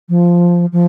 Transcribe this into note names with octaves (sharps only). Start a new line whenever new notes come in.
F3
F3